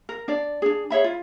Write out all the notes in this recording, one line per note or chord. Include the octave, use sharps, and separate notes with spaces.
A#4
D4 D5
D4 G#4
G#4 C#5 E5 B5
F4